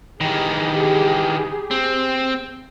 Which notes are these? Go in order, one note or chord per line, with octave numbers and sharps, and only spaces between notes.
D#3 E3 G4 G#4
C4